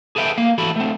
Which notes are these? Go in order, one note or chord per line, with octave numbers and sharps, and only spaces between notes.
G#4 A4 B4 E5 F5 G5
A#3 F5
E3 F#4 A4 B5
A3 C4